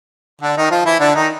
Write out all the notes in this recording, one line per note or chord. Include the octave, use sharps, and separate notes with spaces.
D3 D4
D#3 D#4
F3 F4
E3 E4
D3 D4
D#3 D#4